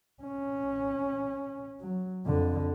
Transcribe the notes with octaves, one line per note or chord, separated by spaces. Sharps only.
C#4
F#3
F2 D3